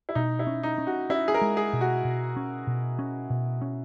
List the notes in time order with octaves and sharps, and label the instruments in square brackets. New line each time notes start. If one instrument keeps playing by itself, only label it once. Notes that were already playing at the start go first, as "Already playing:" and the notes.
[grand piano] E4
[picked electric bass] B2 [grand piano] D#4
[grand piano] E4
[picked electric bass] C#4
[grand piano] D#4
[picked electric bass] C#4
[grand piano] F#4
[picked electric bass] C#4 [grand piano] E4
[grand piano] G#4
A#4
[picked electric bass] G#3
[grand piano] G#4
[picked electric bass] B2
[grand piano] F#4
[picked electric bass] B2
C#4
B2
C#4
B2
C#4